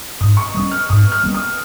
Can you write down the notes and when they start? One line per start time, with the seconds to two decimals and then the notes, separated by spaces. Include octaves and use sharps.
0.21 G#2 D#6
0.37 C#6
0.54 G3 A#3 C#4 D#6
0.72 F6
0.89 G#2 D#6
1.12 F6
1.23 G3 A#3 C#4
1.35 D#6